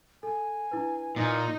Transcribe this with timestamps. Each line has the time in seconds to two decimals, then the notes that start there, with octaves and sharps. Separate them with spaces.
0.23 A4 G#5
0.71 D4 E4 B4
1.16 A#2 D#4